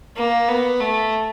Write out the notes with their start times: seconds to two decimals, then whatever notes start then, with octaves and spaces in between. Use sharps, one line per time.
0.17 A#3
0.49 B3
0.80 A3